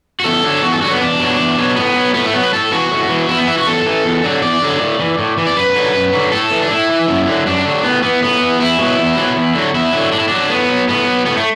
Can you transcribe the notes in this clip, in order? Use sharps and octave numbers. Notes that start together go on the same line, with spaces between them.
F#4
E2 A4
D3 F#3
E2 F#4
A4
D3 F#3 F#4
B3
E2 D4
B2 F#3
E2
B2 F#3
A2 B3
F#3
A2 B3
A3
F#3 B3
B4
A2 A4
E3 F#4
A2
E3
E2 E4
B3
E3 E4
F#4
E2 A4
E3
E2
D3 F#3
E2 D5
D3 F#3
A2
E3
A2
E3
D5
F#2 B4
D3 F#3
F#2
D3 F#3
A2 A4
E3
D4
A2 E4
E3
F#2
D3 F#3
F#2 D4
D3 F#3
A2 B3
E3 B3
A2 B3
E3
E2 E4
B2 F#3
E2
B2 F#3
E2
D3 F#3
E2 E4
D3 F#3
A2 D4
E4
F#3 D4
A2 B3
F#3
A2 B3
F#3
A2 B3
A3